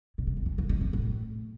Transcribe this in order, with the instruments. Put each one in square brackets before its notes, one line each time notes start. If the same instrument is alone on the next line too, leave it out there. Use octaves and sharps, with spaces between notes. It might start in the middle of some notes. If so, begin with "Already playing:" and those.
[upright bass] B2
C#3
D#3
E3
E3
D#3
D#3
A2